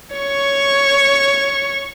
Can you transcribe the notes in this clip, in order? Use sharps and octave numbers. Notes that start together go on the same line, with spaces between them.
C#5 C#6